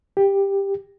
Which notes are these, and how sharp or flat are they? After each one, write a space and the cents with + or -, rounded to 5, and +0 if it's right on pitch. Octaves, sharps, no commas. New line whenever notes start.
G4 +10